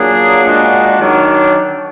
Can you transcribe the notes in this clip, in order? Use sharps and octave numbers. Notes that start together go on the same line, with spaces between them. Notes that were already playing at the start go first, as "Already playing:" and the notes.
Already playing: A#2 F#3 A#3 D4 G#4
A#2 G#3 D4 F#4
D#3 F#3 D4